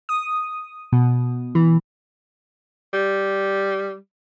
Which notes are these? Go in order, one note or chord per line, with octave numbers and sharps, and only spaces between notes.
D#6
B2
E3
G3